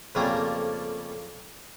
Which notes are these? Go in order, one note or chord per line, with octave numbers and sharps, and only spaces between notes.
F2 C#3 F3 G3 A3 A#3